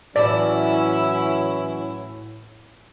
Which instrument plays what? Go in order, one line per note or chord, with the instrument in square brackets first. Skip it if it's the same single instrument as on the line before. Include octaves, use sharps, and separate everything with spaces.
[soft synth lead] A2 [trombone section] E3 F#3 C#4 [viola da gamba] E4 [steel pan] D5